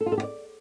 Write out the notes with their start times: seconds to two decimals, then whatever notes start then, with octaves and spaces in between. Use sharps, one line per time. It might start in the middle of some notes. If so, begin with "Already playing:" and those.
0.01 A4
0.06 F4
0.12 A4
0.18 G4
0.23 D5